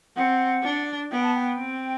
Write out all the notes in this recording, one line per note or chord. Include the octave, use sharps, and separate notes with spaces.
C4 F#5
D4
B3 G5
A5
G5
C4